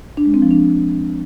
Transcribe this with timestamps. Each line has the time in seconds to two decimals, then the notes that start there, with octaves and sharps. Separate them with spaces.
0.17 D4
0.26 G#3
0.34 C4
0.42 F3
0.51 D4